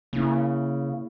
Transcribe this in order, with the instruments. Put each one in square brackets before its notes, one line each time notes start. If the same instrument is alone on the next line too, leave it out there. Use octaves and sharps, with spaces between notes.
[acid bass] C#3 [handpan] A#3 E4